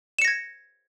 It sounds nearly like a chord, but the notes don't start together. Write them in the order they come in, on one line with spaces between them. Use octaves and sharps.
E7 C#7 A#6 G#6